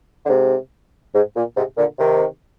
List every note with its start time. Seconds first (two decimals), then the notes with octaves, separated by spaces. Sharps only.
0.25 D3
0.29 G#2 C3
1.14 G#2
1.35 A#2
1.56 G#2 C3
1.77 A#2 D3
1.98 C3 D#3